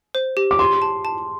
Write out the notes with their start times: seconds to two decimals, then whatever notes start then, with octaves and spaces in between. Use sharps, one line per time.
0.15 C5
0.37 G4
0.51 D6
0.59 G4 C6
0.82 A5
1.05 A5